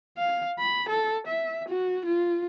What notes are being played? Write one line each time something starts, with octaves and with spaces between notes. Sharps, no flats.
F5
B5
A4
E5
F#4
F4